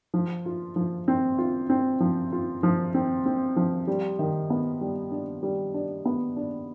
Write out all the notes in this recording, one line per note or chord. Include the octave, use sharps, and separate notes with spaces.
F3
F4
F3
C4
F4
C4
F3
F4
F3
C4
C4
F3
G3
D#3
B3
G3
D4
G3
D4
B3
D4